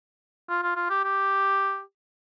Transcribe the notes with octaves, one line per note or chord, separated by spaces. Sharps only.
F4
F4
F4
G4
G4